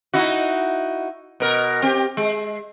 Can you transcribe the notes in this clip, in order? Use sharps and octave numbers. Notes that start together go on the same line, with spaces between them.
D#4 E4 F#4
B2 A#4
C4 G4
G#3